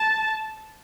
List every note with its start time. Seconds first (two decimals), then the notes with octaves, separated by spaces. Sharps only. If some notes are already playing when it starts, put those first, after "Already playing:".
Already playing: A5